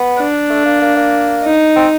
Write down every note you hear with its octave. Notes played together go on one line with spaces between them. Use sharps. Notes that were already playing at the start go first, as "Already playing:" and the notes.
Already playing: B3
D4
A3
A#3
A#3
A#3
D#4
C4